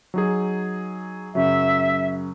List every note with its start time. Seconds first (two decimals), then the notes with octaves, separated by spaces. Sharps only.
0.14 F#3 D#4 G#4
1.35 F#2 C#3 F#3 E5